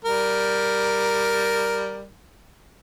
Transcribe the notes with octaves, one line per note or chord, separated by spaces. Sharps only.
G3 A#4